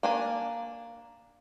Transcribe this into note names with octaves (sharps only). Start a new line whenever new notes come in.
A#3 D4 G#5